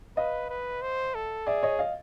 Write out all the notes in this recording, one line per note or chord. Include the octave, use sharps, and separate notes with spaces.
B4 D#5 F5
B4
C5
A4
G#4 D5 E5
C#5 D#5
D#5 F5